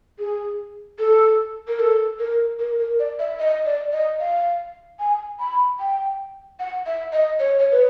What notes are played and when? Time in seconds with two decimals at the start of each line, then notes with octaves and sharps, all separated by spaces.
0.19 G#4
0.99 A4
1.68 A#4
1.80 A4
2.19 A#4
2.59 A#4
2.79 A#4
2.99 D5
3.19 E5
3.39 D#5
3.66 D5
3.92 D#5
4.20 F5
5.00 G#5
5.39 B5
5.80 G5
6.59 F#5
6.86 E5
7.13 D#5
7.39 C#5
7.60 C#5
7.72 B4